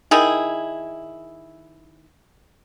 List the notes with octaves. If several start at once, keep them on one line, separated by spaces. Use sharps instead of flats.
D#3 E4 G#4